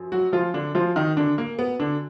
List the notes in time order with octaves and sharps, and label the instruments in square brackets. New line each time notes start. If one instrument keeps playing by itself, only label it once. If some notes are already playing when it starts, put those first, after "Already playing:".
Already playing: [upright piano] F#2 F3
F#3 F#4
F3 F4
D3 D4
F3 F4
D#3 D#4
D3 D4
A#3
B3
D3 D4